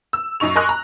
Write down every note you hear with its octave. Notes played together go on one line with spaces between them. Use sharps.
E6
F#2 D#4 C#6 F7
A#4 D#5 G#5 C6 C#6 F#6
A#5